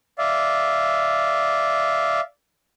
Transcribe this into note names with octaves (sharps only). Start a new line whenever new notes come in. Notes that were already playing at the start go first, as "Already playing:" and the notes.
D5 E5 F5